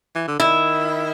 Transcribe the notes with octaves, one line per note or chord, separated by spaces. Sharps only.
E3
D3
D#3 E4